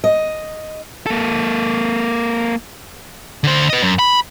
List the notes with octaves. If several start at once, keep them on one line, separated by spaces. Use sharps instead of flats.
D#5
A#3 A4
D3 C5
B4 D#5
F#2
B5